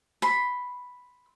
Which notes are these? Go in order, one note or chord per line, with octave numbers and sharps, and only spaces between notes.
B5 C6